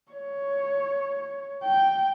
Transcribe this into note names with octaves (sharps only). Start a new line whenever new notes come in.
C#5
G5